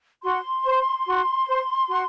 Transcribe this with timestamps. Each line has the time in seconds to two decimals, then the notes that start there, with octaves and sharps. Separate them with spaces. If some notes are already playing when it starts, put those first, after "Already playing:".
0.22 F#4 C6
0.65 C5
1.06 F#4
1.47 C5
1.88 F#4